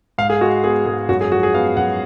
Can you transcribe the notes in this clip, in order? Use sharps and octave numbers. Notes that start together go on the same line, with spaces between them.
G#2 F5
G#4
G#3 F#4
B3 G#4
G#2 G#4
F#2 F#4
G#4
F3 F#4
G#4
B3 F5
F#2 F#5